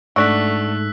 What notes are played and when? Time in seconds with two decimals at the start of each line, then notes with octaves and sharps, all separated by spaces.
0.16 G#2 A3 D4 F#4 E6 F#6 B6